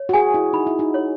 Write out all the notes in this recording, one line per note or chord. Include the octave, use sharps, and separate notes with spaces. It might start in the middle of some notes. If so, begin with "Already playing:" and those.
Already playing: C#5
F#4
G#4 G#5
E4
D#4 B5
E4
D#4
C#5